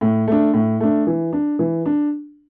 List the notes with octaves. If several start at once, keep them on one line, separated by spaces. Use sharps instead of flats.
A2
A3 D4
A2
A3 D4
E3
D4
E3
D4